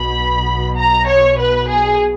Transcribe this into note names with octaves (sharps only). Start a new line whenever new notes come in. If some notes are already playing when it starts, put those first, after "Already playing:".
Already playing: B1 B2 B5
A#5
C#5
B4
G#4